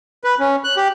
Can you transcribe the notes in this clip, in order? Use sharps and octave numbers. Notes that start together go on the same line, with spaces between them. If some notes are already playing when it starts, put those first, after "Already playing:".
B4
C#4
F#6
G4